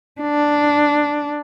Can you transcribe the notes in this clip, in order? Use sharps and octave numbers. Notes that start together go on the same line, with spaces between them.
D4